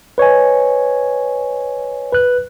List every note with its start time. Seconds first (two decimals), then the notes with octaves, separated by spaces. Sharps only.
0.18 B4 C#5 D#5 G#5
2.12 B4 F#6